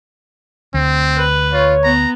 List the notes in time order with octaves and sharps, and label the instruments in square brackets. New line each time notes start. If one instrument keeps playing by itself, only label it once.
[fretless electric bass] D2 [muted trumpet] C4
[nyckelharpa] B4
[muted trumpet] F4 [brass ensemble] C#5
[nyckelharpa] B3 [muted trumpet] A#5